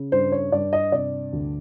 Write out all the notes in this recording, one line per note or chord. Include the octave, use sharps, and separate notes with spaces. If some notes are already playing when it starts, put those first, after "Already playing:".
Already playing: C#3
G2 C5
C#5
G2 D5
D#5
C3 D5
D2